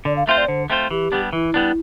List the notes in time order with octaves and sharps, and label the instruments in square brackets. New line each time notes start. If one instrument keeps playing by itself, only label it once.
[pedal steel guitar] D3 [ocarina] D5
[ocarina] F5
[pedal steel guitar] A3 C4 F4 C5 [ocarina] E5
[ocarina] D5
[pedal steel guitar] D3 [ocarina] C5
[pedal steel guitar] A3 C4 F4 C5
[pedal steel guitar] E3 [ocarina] G4
[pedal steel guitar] G3 B3 D4
[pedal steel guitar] E3 [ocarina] E4
[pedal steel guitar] G3 B3 D4